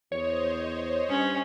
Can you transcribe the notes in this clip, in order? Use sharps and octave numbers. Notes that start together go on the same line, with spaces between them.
E2 C5 C#5 D#5
G2 C#4